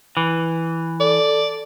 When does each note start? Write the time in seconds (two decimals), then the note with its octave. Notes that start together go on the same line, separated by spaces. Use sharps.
0.17 E3
1.00 A4 D5